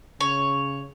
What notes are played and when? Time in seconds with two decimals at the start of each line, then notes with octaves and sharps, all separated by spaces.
0.20 C#3 C#5